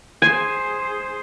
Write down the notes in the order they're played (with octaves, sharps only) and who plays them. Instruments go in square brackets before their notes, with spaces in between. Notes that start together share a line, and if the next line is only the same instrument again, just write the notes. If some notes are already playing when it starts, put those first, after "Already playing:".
[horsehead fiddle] G#4 C5 [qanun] G#5